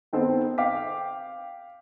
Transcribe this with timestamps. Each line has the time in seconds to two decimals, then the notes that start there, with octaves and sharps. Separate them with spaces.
0.13 D#3 B3 C4 A4 C5
0.58 F5 G5 D6 B6